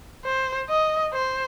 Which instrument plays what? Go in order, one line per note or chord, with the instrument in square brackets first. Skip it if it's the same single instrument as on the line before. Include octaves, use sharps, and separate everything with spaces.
[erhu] C5
D#5
C5